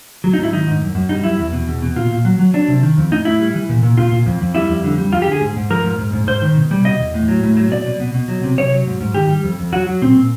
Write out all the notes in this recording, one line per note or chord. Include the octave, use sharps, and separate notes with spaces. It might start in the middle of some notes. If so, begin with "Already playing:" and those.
F#3
D#4
G#2
E4
D#3 D#4
G#2
F#2
F#2
G3 D#4
F#2 E4
E2
B2
E2
B2
A#2 F4
A#2
F#3
F#3
F#3 D4
C3
D#3
F2
A2 D#4
A2 E4
G3
E3
A#2
A#2
A#2 F4
A#2
F2
F2
G3 E4
F2
D3
G3
F2 F4
G4
D3
G#4
G#2
G#2
F3 A#4
G#2
G#2
G#2
G#2 C5
D#3
B2
G3
B2 D#5
E2
A2
F#3
A2
F#3
B2 D5
B2
B2
B2
F#3
C3
C3 C#5
F#3
G#2
G#2
D#3 G4
G3
F2
F2
F#3 F#4
F#3
A#2 C4
A#2